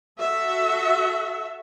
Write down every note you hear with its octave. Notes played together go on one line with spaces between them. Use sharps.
F#4 A4 E5